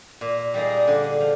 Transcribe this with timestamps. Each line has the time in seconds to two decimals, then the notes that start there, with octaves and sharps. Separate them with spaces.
0.21 A#2
0.54 G3 A#3 D#4 G#4
0.87 D3
1.20 F3